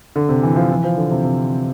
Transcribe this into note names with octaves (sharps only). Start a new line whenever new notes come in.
D3
C3
E3
F3
E3
F3
D3
C3
C3